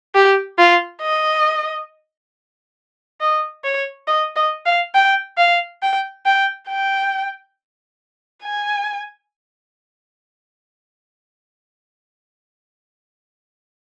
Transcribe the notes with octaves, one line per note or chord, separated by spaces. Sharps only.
G4
F4
D#5
D#5
C#5
D#5
D#5
F5
G5
F5
G5
G5
G5
G#5